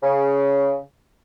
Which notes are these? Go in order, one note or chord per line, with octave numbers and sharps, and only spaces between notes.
C#3